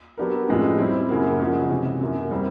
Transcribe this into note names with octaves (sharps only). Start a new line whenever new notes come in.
F#3 B3 D4 G4 A#4
A2 F3 G#3 C#4
G3 C4 E4
F#2 C#3 F#3 A#3
C#3 F3 G#3 C#4 F#4
C3 E3 G#3
F#2 D3 F#3 A#3
G3 C4 E4 G4 A#4